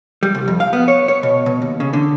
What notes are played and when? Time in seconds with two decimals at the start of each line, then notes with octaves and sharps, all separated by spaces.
0.23 G3
0.35 C2
0.48 F2
0.60 F5
0.73 B3
0.88 C#5
1.08 C#5
1.23 B2
1.46 B2
1.62 D#2
1.80 C#3
1.93 D3